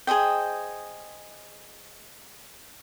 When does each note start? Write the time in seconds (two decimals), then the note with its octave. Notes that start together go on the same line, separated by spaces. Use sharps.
0.07 G#4 C5 D#5 G5